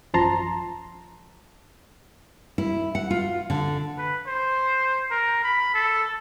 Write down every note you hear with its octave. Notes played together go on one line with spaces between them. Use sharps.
A1 F#2 F3 A5 A#5 C6
E4
F#5
F4
D3
B4
C5
A#4
B5
A4